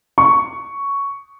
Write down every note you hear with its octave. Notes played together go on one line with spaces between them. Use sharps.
C#6